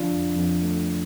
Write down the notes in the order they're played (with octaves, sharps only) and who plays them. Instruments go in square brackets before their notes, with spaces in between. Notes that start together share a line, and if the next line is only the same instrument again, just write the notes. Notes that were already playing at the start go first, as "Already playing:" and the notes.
Already playing: [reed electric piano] D3 F3 D4 F4
F2
F2
A3